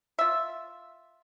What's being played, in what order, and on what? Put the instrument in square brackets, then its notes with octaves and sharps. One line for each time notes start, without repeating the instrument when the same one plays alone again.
[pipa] F4 E5